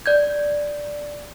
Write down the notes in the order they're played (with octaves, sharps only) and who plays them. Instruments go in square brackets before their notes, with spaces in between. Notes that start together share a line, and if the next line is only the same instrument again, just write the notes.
[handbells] D5 G6 G#6